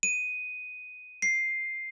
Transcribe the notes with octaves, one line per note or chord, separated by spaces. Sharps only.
D#7
C7